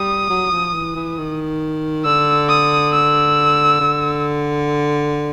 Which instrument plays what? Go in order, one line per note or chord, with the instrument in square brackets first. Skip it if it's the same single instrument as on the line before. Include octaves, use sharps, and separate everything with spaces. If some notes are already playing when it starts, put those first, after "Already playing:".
Already playing: [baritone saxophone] G3 [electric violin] D#6
[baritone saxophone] F#3
F3
E3
E3
D#3
[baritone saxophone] D3 [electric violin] E6
[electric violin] D#6
E6
[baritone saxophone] D3